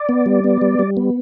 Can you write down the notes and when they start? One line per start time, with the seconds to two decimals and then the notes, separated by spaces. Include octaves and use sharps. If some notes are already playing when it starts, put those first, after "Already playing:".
Already playing: D5
0.09 B3
0.26 G3
0.44 B3
0.61 G3
0.79 G3
0.97 B3